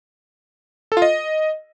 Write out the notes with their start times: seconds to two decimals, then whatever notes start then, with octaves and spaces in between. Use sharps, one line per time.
0.92 A4
0.97 F4
1.02 D#5